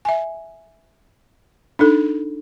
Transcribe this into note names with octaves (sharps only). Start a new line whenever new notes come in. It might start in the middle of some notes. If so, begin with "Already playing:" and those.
E5 G#5
D4 D#4 A4